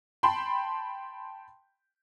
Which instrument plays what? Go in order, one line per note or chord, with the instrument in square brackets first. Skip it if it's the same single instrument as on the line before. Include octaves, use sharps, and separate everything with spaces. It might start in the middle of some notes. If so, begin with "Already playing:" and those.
[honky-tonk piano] G5 A5 B5 C6